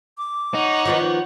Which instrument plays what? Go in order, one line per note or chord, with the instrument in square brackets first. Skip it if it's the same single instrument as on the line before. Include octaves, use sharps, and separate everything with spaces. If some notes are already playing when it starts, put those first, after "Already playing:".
[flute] D6
[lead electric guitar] D#4 [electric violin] C#5 F#5
[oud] D#3 F3 B3